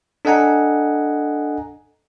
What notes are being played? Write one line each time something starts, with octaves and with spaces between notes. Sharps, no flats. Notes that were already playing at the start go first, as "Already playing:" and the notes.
D4 A4 D#5 F#5 G#5 A#5